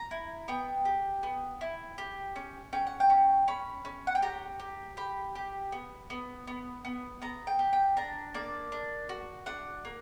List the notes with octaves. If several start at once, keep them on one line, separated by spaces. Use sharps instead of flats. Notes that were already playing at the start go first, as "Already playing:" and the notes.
Already playing: A#5
E4
B3 G5
G4
B3
E4
G4
C#4
C#4 G5
F#5
G5
C#4
C#4 B5
C#4
F#5
G5
G4 A#5
G4
G4 B5
G4
B3
B3
B3
B3
B3 A#5
G5
G4
G5
D4 A#5
A#3 D5
D4
F#4
D4 F#5
A#3